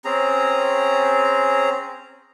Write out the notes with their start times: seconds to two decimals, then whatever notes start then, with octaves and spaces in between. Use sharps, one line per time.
0.05 C4 C#4 G#4 A#5